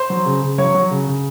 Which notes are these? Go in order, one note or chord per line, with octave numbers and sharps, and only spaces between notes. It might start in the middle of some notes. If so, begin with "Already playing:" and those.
Already playing: C5 C6
F#3
C#3
C#3
F#3 C#5 C#6
F#3
C#3
C#3